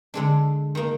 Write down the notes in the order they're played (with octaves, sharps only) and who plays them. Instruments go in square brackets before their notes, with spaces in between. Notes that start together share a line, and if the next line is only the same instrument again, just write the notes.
[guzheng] D3 G#3 D4
D#3 A#3